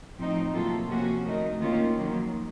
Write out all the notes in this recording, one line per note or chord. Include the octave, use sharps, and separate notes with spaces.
A2 F3 C4 D#4
C3 F#3 A#3 F4 A4
C3 F3 A#3 C#4 F#4
D#3 A3 D#4 A#4
D#2 D#3 A#3 C#4 F4
F2 D#3 F#3 A#3